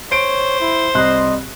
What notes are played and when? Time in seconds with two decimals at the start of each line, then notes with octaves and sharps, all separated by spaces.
0.12 C5 C#5 D7
0.60 E4
0.95 C2 D#5 C6 F#6